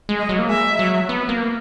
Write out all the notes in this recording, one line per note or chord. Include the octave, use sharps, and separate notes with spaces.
G#3
D#5
F#3
A#3
G#3 E5
F#3
B3
A#3